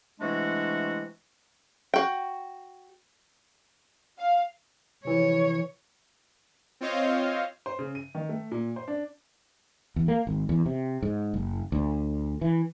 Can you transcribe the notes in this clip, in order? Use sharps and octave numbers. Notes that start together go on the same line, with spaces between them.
C3 E3 G#3 A3 D4 F#4
F#4 G5
F5
C3 E3 F3 C#5
C4 F4 C5 C#5 D#5 F5
C5
C#3
D#7
D#3
A3
A#2
C5
D4
E2
A#3
G#1
E2
C3
G#2
F#1
D2
E3